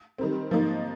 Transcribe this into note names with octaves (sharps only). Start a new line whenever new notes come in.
D#3 G3 C4
G#2 F3 A#3 D#4